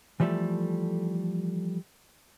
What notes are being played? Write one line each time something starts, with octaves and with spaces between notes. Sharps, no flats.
E3 F3 G3 A3 A4